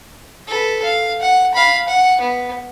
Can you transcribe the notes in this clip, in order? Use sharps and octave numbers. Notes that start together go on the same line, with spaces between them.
A4 B4
F5
F#5
F5 B5
F#5
B3